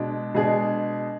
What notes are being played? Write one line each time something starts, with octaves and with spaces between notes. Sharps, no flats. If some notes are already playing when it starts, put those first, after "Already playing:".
Already playing: B2 G#3 D4
B2 G#3 D4 G#4